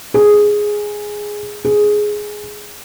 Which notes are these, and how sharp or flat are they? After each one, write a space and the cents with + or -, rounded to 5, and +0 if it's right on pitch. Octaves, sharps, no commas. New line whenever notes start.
G#4 +0
G#4 +5